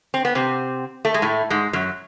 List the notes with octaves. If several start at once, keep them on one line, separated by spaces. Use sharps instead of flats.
C4
B3
C3 C4
A3
G#3
A2 A3
G#2 G#3
F#2 F#3